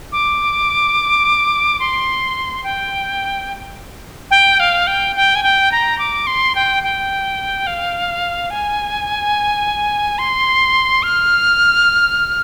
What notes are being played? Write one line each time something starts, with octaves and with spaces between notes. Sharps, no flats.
D6
C6
G5
G5
F5
G5
G5
G#5
G5
A#5
D6
C6
G5
G5
F5
G#5
C6
F6